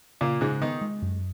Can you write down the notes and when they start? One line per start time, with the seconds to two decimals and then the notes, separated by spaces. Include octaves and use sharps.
0.21 A#2 C#3 A#3
0.41 G#2 C#3 G#3
0.62 D#3 B3 D#4
0.81 G#3
1.02 F#2